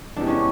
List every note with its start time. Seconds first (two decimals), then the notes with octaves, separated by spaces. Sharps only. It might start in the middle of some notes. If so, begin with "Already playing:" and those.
0.16 E2 C3 E3 G#3 D4
0.27 C#4